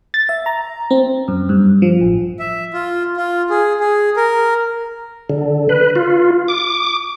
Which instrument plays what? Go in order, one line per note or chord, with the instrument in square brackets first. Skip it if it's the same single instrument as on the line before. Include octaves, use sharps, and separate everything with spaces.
[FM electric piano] A6
E5
A#5
C4
F#2
G2
F3
A1
[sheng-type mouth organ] E5
F4
F4
G#4
G#4
A#4
[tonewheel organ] D3
B4
F4
D6